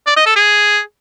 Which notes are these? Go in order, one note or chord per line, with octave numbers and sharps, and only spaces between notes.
D5
D#5
A4
G#4